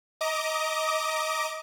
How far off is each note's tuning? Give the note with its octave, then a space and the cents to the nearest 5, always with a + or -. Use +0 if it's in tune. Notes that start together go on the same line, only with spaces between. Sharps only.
D#5 +20 A#5 +0 D6 +0